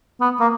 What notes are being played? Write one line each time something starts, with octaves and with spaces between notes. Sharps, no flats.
B3
A#3